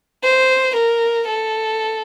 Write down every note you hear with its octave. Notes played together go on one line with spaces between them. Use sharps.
C5
A#4
A4